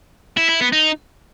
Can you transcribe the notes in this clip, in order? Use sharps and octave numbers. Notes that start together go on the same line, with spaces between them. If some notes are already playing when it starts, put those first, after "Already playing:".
E4
E4
B3
D#4